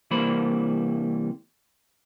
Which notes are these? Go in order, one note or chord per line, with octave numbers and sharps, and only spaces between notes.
C3 E3 G3 A#3 C5 B5